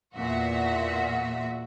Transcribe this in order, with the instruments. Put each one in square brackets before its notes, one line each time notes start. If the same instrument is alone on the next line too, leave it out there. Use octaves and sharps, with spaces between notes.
[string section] E2 A#2 F#4 E5